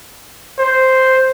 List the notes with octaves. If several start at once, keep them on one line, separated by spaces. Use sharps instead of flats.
C5